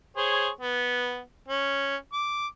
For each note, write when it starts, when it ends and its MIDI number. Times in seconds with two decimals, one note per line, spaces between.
0.17 0.49 68
0.17 0.49 72
0.17 0.49 73
0.61 1.20 59
1.48 1.96 61
2.13 2.47 86